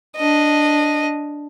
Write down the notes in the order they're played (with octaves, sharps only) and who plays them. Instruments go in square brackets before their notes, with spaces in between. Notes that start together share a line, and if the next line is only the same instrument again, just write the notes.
[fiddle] D4 D#5